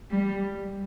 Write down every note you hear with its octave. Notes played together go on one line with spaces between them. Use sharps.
G3